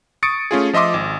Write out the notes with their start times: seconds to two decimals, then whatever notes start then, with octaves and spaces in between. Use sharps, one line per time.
0.23 C#6 D#6 A6 C#7 D7
0.51 A3 C#4 F4 G#4
0.73 F3 D#5 E5 C6 D6
0.94 G#1